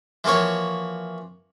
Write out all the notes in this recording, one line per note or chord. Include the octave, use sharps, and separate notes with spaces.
E3 F3 A#3 F#4 C#5